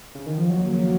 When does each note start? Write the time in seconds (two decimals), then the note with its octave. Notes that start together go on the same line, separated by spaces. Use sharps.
0.15 C#3
0.26 D#3
0.37 F3
0.49 D#2 C#3 F3 F#3 A#3